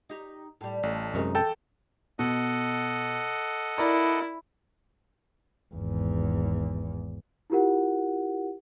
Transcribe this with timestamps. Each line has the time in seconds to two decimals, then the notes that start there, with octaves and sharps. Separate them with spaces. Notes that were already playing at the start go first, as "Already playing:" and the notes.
0.09 D#4 G4
0.61 A2 G3
0.83 A1 A3
1.14 F#2 C3 G#3 D#4 A#4 C#5
1.35 E3 A4 G5 A5
2.19 B2 A4 D#5 F#5
3.78 E4 A#4 D5 A#5
5.75 G#1 E2
7.50 E4 F4 G4 A#4 F#5